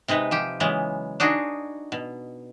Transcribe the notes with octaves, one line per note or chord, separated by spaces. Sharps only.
C3 G#3 D#4 B4
F3 G4
C#3 E3 F#3 G#3 B3
D4 D#4 F#4 G#4
B2